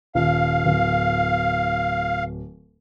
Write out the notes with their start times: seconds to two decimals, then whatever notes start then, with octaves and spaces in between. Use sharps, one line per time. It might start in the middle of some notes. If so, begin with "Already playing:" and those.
0.15 D#1 F5
0.65 D1